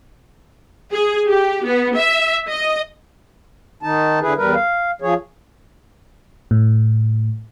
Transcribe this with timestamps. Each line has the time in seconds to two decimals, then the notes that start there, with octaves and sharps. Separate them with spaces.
0.93 G#4
1.29 G4
1.65 B3
1.96 E5
2.51 D#5
3.83 D#3 D#4 A5
4.21 D3 E4 G#4 B4
4.37 E2 G3 A#4 B4
4.55 F5
5.02 F3 G#4 C#5
6.51 A2